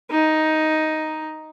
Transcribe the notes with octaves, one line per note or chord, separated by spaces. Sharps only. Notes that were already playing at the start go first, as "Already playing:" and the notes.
D#4